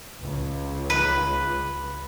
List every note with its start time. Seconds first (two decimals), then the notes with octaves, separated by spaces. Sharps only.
0.21 C#2
0.90 B4